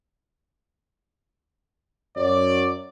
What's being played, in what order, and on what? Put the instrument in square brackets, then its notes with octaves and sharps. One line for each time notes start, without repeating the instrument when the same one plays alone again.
[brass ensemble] F#2 F#3 C#5 D5